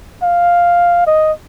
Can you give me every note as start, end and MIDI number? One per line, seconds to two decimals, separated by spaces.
0.23 1.03 77
1.07 1.32 75